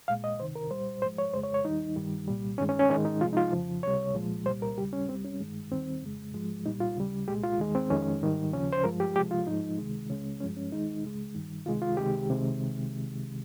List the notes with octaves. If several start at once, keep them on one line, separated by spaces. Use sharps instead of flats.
C2 A#2 G#3 F5
D#5
C#2 C3 D#3 C5
A#4
C2 A#2 G3 C5
G#2 F3 G#3 C5
C#5
F2 C#3 G#3 C5
C#5
C#5
D#2 D#3 G3 D#4
G2 D#3 G3
C2 A#2 G3
G2 D#3 G#3 C#4
C#4
C#4
G#2 D#3 G#3 C#4
D#4
C2 C3 F3 G#3 F4
D#4
F4
F2 C#3 F3
C#2 C3 G3 C#5
C2 A#2 F3 G#3
C2 A#2 G3 C5
A#4
D#2 C#3 G3 G4
C#4
C2 C3 G3 C4
C#4
G2 D#3 G#3
D#2 D#3 G3 C4
F2 C#3 G#3
G#2 F3 G#3
C2 A#2 G3 D#4
F4
D#2 C#3 G3
C2 A#2 G#3 G4
F4
D#2 D#3 G#3
C4
F2 D#3 G#3 C#4
G#2 D#3 G3
D#2 C#3 F3 C#4
C5
G2 F3 G#3 A#4
G4
C#2 C3 F3 G#3 G4
F4
G#2 F3 G#3 D#4
C#2 C3 D#3 G#3
C#2 C#3 G#3 C#4
G2 F3 G#3 C#4
C#4
D#2 D#3 G#3 D#4
C#2 C#3 G#3
G2 D#3 G3
C#2 C3 D#3 G#3 F4
F4
C#2 C3 D#3 G#3 G4
C2 C3 D#3 G#3